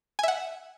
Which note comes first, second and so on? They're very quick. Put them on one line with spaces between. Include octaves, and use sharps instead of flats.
G#5 E5 F#5